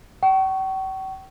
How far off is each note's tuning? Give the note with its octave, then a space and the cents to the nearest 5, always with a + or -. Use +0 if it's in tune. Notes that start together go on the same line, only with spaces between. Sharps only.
G5 -45 C#6 +0